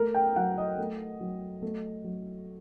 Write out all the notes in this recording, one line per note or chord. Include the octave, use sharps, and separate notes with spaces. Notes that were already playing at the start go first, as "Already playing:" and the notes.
Already playing: A3 A#4
G5
F#3 F#5
D#5
A3
F#3
A3
F#3